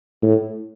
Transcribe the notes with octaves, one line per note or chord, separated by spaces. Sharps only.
A2